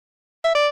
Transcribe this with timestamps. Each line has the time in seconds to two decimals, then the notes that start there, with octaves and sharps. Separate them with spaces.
0.44 E5
0.55 D5